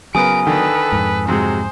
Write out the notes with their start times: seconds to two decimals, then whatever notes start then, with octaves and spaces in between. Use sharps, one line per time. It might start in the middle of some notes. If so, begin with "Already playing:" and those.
0.15 C#3 F#3 B3 A#4 B4 G#5 D#6 D7
0.47 D3 D#3 A4 B4
0.92 F2 G#2
1.28 C3 F#3 G#3 C5